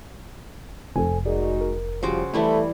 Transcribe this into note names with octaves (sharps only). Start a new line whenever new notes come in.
F1 A4 C5 G#5
G#3 D#4 F#4 G#4 A#4 D5
A#4
C#3 F3 G3 F#4 C5 C6 D6
E3 G3 A3 E4